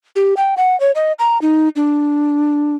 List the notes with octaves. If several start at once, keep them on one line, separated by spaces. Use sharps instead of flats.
G4
G5
F#5
C#5
D#5
A#5
D#4
D4